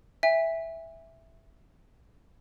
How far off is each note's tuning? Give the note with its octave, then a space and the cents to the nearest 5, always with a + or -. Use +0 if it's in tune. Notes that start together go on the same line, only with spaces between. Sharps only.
E5 +0 G#5 -40